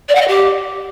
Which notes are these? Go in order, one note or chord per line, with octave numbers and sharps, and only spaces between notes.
D5
F#5
D#5
G4